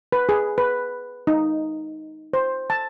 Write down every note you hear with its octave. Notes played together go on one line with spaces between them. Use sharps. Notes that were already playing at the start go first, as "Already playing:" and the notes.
B4
G#4
B4
D#4
C5
A5